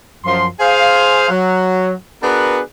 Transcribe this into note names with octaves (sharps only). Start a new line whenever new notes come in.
F#2 F3 C6
G#4 C5 F5
F#3
B3 D4 F#4 G#4 A#4 B4